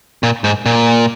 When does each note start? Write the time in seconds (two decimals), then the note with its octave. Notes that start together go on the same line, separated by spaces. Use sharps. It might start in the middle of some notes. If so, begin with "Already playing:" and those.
0.23 A#2
0.44 G#2
0.66 A#2